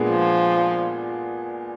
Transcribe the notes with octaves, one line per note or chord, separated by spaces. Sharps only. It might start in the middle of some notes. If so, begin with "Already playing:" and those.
Already playing: A#2 G#3 B3 D4 G#4
F3